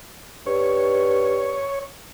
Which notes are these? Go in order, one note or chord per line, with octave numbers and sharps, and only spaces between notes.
G2 C#5